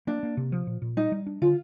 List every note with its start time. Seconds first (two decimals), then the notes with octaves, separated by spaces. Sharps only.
0.07 A#3 D4
0.23 A#3
0.37 C3
0.52 F3
0.67 A#2
0.82 A#2
0.97 G3 D#4
1.12 G3
1.27 D4
1.42 D3 F4